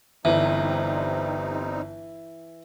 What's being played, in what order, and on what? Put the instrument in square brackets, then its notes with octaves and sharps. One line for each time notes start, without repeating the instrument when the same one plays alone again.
[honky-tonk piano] G1 [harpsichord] E3 [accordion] G3 C4 D#4